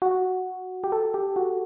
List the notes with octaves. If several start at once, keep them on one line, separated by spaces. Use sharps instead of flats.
F#4
G4
A4
G4
F#4